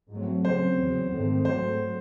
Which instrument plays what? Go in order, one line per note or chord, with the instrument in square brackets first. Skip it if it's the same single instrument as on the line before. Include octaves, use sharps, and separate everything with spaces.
[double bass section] G#2 F#3 A3 C4
[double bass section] C#3 F#3 C4 [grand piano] C5
[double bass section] E2 C#3 F#3
G#2 D#3 A3 C4
[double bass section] G#2 F#3 A3 C4 [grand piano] C5